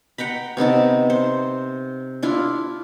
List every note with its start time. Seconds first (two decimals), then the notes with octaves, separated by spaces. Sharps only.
0.18 F#5 G5 A#5 B5
0.57 C3 B3 D#4 A5
1.10 C5
2.23 D4 E4 F4